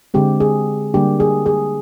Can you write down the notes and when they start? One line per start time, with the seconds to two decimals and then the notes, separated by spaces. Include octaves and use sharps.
0.14 D3 G#3 C4 G4
0.40 G#4
0.94 D3 G3 A#3 D4 G4
1.20 G#4
1.46 G#4